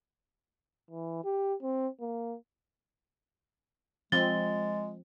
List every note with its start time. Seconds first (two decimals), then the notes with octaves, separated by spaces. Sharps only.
0.91 E3
1.24 G4
1.63 C4
2.01 A#3
4.12 F3 G#3 C4 A6 G7